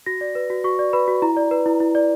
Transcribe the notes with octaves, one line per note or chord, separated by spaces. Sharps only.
F#4 A#6
D5
B4
F#4
F#4 C#6
D5
B4 B5
F#4
E4 A#5
D5
B4
E4
E4
D5